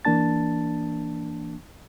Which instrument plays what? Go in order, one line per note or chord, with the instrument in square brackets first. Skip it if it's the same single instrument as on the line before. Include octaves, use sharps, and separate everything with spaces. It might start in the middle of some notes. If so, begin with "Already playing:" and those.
[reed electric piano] E3 A#3 D4 A5 A6